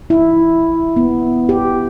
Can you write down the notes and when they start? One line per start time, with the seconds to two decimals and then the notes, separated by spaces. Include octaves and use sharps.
0.10 E4
0.96 B3
1.49 G4